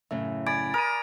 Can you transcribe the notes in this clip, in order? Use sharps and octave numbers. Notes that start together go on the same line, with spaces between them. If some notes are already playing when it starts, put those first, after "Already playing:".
F#2 A2 C#3 E5
D5 G#5 B5 G#6 A6 D7
A#4 D#6 D#7